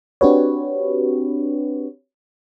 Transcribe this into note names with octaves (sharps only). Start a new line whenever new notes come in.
C4 D4 F#4 G4 B4 C#5